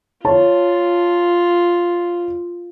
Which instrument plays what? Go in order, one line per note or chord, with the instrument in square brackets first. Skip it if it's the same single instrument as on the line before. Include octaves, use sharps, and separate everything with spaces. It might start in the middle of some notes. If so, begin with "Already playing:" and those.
[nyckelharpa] F4 [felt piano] C#5 A5